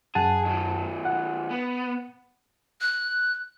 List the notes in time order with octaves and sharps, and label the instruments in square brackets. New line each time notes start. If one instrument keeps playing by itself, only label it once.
[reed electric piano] F#2 F#5 A5 [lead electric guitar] G#4
[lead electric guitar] D#3 F#3
[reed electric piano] F#5
[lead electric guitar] B3
[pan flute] F#6